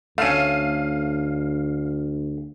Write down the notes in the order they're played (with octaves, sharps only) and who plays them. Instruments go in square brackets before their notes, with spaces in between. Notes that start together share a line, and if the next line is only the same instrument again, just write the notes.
[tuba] D2 [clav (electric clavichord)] A3 C#4 [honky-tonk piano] F5 D#7